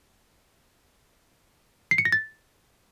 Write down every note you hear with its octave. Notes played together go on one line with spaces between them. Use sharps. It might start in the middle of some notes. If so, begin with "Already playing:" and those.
C7
C#7
A#6
A6